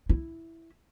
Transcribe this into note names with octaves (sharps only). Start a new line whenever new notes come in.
E4